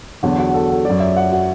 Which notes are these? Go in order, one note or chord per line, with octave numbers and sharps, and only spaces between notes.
E2 D3 F#3 F#4
F#4
A4
A4
F#3 D5
F#2
E5
F#5
F#4